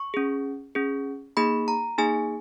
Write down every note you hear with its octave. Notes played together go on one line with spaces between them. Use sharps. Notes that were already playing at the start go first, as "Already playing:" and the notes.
Already playing: C#6
C#4 G#4
C#4 G#4
A#3 D#4 G#4 B5
A#5
A#3 D#4 G#4 G#5